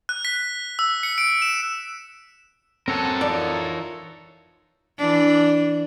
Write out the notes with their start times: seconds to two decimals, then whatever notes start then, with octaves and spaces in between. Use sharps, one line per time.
0.09 F#6
0.25 B6
0.79 E6
1.03 C#7
1.18 D7
1.42 E7
2.88 C4 A4 A#4 C#5 F#5 A5
3.21 E3 D#4 F4 D5
4.98 E3 D4